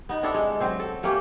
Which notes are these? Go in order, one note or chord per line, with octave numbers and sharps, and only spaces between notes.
B3 D#4
C4 D4 E4 A4
G#3
F#3 C4 C5
A4
A3 A#3 C#4 G4